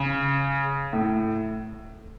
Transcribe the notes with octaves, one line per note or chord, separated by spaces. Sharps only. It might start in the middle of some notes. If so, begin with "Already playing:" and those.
Already playing: C#3
A2